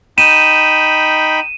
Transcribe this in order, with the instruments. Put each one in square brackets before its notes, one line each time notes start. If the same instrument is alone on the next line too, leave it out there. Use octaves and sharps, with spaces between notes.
[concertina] D#4 G5 B5 [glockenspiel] D#7 E7